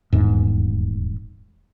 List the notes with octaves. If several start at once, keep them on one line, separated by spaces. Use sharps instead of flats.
D#1 E2 G#2